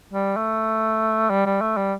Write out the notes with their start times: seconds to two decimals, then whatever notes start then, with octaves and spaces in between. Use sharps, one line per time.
0.13 G3
0.37 A3
1.30 G3
1.46 G3
1.61 A3
1.77 G3